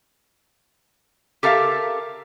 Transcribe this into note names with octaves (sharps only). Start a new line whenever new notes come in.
G4 A4 A#4 E5 F5